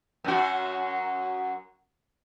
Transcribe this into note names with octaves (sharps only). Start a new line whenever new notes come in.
F#2 F#4